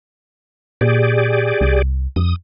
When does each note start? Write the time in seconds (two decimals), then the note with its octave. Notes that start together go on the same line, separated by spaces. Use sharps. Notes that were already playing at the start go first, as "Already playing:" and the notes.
0.81 A#2 G4 G#4 D5
1.61 C2
2.16 F2 D#6